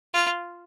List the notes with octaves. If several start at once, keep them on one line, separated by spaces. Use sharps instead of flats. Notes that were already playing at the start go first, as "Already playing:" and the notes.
F4